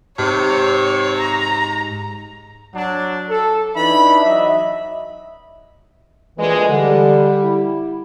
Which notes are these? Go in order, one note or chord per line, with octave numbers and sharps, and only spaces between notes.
G#2 C3 C#5
A#5
F#3 D4
A4
E3 D4 D#4 E5 B5
F#3 D#5 E5
D2 A#2 E3 G#3
D3 G3
E4